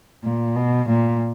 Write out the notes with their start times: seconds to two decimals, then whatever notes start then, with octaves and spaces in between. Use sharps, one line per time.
0.24 A#2
0.56 B2
0.89 A#2